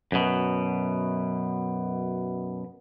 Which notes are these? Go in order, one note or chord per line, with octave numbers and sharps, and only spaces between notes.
F#2 B2